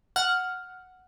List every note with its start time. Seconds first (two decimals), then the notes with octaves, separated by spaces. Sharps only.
0.16 F#5 F6